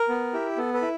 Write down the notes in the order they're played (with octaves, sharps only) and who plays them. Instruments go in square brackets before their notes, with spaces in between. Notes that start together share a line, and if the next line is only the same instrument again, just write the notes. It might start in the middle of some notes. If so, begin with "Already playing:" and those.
Already playing: [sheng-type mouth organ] A#4
B3
E4 G4
B3 A4
A4 B4
E4